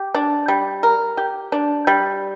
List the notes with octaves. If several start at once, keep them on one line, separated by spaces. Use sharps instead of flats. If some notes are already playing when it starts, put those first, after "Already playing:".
Already playing: G4
D4
G3
A#4
G4
D4
G3